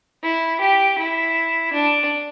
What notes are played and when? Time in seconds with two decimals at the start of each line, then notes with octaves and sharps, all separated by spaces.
0.23 E4
0.60 G4
0.98 E4
1.73 D4